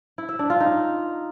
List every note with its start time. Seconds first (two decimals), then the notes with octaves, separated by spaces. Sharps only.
0.18 E4
0.29 E5
0.39 D4
0.50 F4
0.60 D#4